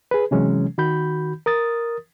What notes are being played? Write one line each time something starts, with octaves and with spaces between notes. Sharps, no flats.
G#4 B4
C3 E3 F#3 G#3 C#4
D#3 F#4 B5 G6
A#4 D#6 A6